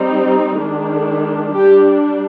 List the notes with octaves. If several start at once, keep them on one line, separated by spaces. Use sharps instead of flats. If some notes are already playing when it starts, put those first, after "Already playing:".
Already playing: G3 C4 D#4
D#3 G#3 D4
G3 D4 G4